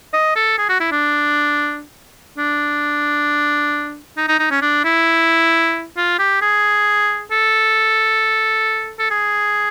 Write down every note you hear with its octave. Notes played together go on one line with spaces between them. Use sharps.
D#5
A4
G#4
F#4
E4
D4
D4
D#4
D#4
D#4
C#4
D4
E4
F4
G4
G#4
A4
A4
G#4